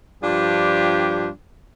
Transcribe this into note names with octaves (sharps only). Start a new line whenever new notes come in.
G2 F3 D4 F4 G4